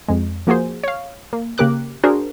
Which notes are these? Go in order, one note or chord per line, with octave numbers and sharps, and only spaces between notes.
F2 G#3
F3 A#3 F#4 G#4 C5
C#5 F5
A#3
C#3 A#3 G4 A#4 D6 F#6
D4 F#4 G#4 A#4 C5